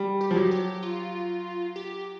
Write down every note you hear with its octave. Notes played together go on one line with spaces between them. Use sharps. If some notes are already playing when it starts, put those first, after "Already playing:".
Already playing: G3
G4
F3
F#3
G4
F4
G4